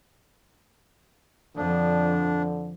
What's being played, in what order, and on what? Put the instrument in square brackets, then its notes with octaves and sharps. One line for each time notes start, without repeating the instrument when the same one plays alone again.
[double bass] F2 F3 [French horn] D3 [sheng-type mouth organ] D4